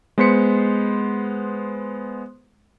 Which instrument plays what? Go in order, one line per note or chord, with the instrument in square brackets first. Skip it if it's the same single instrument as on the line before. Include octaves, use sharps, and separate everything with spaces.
[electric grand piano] G#3 B3 C5 C6 B6 C#7